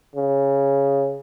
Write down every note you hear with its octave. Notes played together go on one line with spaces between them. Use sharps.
C#3